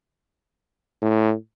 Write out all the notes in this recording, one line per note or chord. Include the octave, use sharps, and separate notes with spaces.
A2